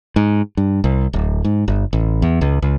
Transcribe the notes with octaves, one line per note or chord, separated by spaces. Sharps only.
G#2
G2
C2
D1
G#2
G1
A1
E2
C#2
C#2